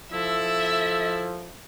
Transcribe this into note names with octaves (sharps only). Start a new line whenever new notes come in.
F3 E4 A4 E5